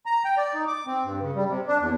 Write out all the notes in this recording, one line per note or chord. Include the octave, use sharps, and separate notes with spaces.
A#5
G5
D5
D#4
D6
C4
G2
C#3
G3
C3
D4
E2